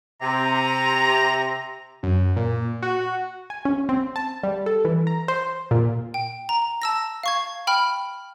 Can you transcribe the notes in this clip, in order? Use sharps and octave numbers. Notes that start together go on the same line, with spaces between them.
C3 A#5
F#2
A#2
F#4
G#5
C#4
C4
A5
G3
A4
E3
A#5
C5
A#2
G5
A#5
A5 E6 A#6
F5 C#6 G#6
G5 B5 F6